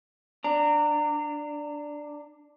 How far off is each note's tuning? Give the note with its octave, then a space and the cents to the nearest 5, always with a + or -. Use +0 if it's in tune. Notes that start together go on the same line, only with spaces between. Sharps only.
D4 +0 A#5 -25